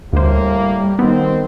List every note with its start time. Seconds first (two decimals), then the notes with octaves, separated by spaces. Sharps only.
0.13 D2 A2 G3 A#3 C5
0.99 D#3 B3 C4